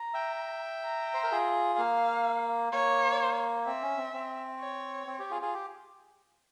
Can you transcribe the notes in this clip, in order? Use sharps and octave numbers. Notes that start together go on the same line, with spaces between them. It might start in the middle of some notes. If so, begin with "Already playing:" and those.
Already playing: A#5
E5 G5
A#5
C5
A#4
F4 G#4
A#3 F5
A#3 C#5
C4 E5
C#4
C4
C4
C#5
C4
G4
F4 G#4
F4 G#4
G4